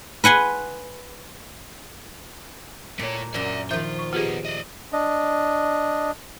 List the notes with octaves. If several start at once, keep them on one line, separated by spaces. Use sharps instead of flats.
B4 F#5 G#5 C6
A#2 A3 C#5
F#2 A#2 D5 E5
D#3 F3 F4 E5 G6
C#6
B3 D#4 F4 G4 G#4
D5 D#5
D4 D#5